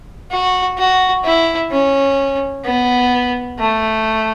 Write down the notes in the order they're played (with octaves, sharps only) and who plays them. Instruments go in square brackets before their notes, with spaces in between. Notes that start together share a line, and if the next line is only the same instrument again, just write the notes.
[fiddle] F#4
F#4
E4
C#4
B3
A3